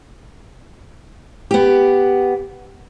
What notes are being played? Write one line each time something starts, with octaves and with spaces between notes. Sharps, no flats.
B3 G4